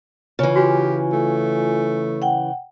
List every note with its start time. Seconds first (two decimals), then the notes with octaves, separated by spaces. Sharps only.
0.39 C#3 E3 F4 G#5
0.56 F#4 G4
1.12 A3
2.22 F#5 G5